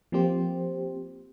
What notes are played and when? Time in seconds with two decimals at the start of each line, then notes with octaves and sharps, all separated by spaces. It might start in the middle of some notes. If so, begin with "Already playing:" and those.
0.12 F3 A#3 C4 G4 C5